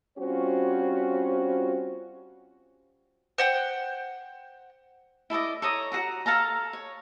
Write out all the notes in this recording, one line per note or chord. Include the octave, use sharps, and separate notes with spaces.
G3 C4 C#4 F4 F#4 C5
C5 F#5 G5
E4 A4 D5 D#5
A4 C#5 A#5 D#6
F#4 G#4 F#5 A#5
A4 F5 A5 A#5
C#5